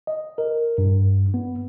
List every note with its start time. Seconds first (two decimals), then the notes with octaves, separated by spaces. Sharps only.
0.07 D#5
0.38 A#4
0.78 G2
1.34 B3